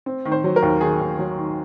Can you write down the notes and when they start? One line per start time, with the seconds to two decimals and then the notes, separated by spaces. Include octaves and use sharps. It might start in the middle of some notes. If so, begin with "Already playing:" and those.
0.06 C4
0.25 D#3
0.32 C5
0.44 F#3
0.56 A#4
0.62 D#2
0.81 D#3 G#4
1.00 D#2
1.19 F#3
1.37 D#3